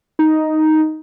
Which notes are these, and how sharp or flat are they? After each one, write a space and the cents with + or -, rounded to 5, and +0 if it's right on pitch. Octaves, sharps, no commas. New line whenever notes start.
D#4 +5